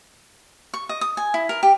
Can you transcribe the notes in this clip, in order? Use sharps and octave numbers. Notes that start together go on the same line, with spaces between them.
C#6
D#5
D#6
G#5
E4
A#4
G4